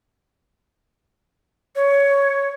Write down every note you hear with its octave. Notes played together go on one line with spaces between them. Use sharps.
C#5